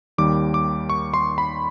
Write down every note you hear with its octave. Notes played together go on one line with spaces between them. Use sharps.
D#2 D#3 G3 D6
D6
C#6
C6
B5